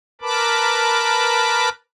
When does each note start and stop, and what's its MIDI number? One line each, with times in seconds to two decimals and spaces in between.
0.21 1.69 70
0.21 1.69 71
0.21 1.69 81
0.21 1.69 83
0.21 1.69 86